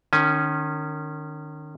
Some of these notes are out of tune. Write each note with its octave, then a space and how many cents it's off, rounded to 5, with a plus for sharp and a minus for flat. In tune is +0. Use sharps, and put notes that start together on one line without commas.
D#3 -30 C#4 +0 G#5 +0